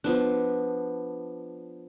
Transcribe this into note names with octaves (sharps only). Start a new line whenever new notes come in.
F3 B3 D4